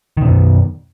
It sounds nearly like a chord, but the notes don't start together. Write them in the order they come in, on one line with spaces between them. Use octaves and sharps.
D#3 B2 F#2